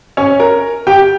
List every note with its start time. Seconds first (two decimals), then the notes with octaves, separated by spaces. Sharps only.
0.17 C#4 C#5
0.40 A#4
0.87 G4 G5